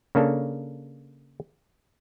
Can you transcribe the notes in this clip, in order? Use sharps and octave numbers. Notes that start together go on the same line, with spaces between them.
C#3 A#3 D4 A4 C#5